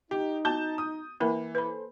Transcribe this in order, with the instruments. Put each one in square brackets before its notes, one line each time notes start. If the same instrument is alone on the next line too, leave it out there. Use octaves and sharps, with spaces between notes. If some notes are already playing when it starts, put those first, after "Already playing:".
[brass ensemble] D#4 [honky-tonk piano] G4
[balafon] B3 F#4 [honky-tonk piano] A5 G6
[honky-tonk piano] D#6
[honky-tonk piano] E3 [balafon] A#3 A#4 B5
[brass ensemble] A4 C5 [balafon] B4 B5